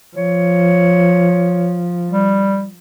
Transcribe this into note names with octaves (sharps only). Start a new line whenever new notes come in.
F3 C#5
G3